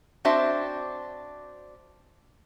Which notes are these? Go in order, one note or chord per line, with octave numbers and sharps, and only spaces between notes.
C4 D4 F#4 C5 E5 A5